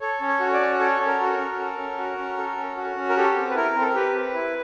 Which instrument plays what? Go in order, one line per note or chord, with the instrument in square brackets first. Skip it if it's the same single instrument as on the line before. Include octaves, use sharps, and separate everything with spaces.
[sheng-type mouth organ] A4 C#5
C#4
C#5
F#4
D5
C#4
A4 C#5
C#4
A#4
F#4
A#4
C#4
A4
C#4
F#4
C#4
A4
C#4
F#4
C#4
A#4
G4 A4
C4
B4
E4 A#4
C4
A4
A#4
G4 B4
C4
E4